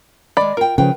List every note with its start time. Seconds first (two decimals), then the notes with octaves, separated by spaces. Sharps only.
0.37 D#3 G#3 D5 B5
0.57 F4 A#4 G5
0.78 C#3 F3 F4 B4 G5